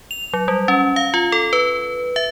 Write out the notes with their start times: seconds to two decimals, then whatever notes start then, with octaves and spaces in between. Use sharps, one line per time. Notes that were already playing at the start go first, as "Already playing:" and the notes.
0.11 F7
0.33 F#3
0.48 G3
0.68 C#4
0.96 F5
1.14 F4
1.32 A4
1.53 B4
2.16 E5